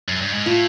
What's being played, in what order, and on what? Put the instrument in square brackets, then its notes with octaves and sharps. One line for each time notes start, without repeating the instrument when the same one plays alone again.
[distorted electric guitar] F#2
G2
G#2
[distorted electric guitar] A2 [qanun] F4